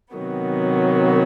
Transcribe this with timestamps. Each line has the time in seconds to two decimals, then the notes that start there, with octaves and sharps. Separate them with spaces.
0.15 C3 D#3 F#3 B3